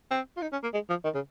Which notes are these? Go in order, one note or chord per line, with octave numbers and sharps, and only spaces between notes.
C4
F4
D#4
C#4
A#3
G#3
F3
D#3
C#3